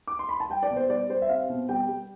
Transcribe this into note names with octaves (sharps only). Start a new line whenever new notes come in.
D6
C6
B5
A5
G3 G5
D5
B2
C5
G3 D5
G3 C5
E5
C4 F5
B2
G3 G5
G3